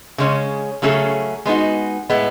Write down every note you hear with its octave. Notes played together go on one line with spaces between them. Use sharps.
C#3 G#3 C#4
C#3 F#3 A3 C#4 G#4
G#3 B3 D#4 F#4
A2 G#3 B3